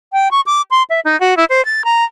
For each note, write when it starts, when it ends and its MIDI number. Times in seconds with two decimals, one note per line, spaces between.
0.13 0.28 79
0.31 0.41 85
0.46 0.62 86
0.71 0.83 84
0.90 1.00 76
1.05 1.18 63
1.20 1.37 66
1.37 1.45 64
1.49 1.64 72
1.65 1.84 93
1.85 2.04 82